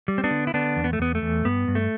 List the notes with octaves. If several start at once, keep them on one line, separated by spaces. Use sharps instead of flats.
G3
C4
B3 D4
D3
E4
D3 B3 D4
E2
B3
A3
E2 B3
A3
E2
G2 B3
G2
A3